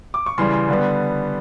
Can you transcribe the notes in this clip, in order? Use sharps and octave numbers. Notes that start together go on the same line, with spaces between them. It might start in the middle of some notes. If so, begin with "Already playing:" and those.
D6
C#6
C#3 E3 G3 C6
C6
D3 G3 B3